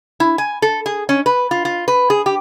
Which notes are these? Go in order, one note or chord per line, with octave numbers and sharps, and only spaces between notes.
E4
G#5
A4
G#4
C#4
B4
F4
F4
B4
G#4
G4